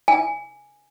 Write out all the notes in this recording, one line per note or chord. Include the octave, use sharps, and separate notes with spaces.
G#5